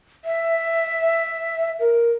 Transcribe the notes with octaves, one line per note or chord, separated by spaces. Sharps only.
E5
A#4